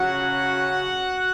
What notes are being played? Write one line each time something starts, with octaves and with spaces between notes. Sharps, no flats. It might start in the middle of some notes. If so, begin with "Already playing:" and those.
Already playing: C#3 F#3 C#4 F#4 F#5